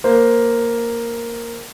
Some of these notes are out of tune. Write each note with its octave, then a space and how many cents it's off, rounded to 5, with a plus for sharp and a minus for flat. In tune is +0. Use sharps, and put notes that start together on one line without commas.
A#3 +0 C5 +0